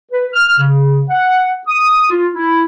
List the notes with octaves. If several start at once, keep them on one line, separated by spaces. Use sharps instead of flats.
B4
F6
C#3
F#5
D#6
F4
E4